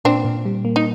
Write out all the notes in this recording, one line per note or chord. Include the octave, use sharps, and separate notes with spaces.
A#2 C4 D4
A#2
G3
A#3
D#4